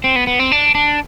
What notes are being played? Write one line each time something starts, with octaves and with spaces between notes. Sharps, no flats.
C4
B3
B3
C4
D4
D4